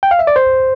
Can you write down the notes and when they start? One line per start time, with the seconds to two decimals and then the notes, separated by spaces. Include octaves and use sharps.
0.03 G5
0.11 F5
0.19 E5
0.27 D5
0.36 C5